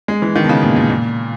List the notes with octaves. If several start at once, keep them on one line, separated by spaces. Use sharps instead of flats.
G#3
E3
D#3
B2
C#3
A#2
A#2
A#2